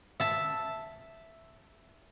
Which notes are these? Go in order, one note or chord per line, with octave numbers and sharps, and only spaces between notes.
E5 A5